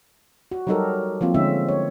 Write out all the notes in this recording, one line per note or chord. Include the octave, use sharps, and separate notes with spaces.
F#4
F#3 G3 D#4 G4 A4 A#4
F3 A#3 C4 F4
D3 G#3 C#4 D#4 E5
C#5